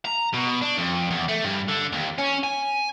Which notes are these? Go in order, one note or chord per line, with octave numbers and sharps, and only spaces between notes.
A#5
B2
D4
F2
E2
A3
G2
D3
D#2
C#4
G#5